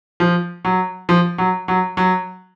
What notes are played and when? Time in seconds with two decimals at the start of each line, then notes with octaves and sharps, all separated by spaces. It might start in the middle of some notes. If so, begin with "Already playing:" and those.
0.20 F3
0.65 F#3
1.09 F3
1.38 F#3
1.68 F#3
1.97 F#3